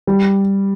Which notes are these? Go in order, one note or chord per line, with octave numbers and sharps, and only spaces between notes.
G3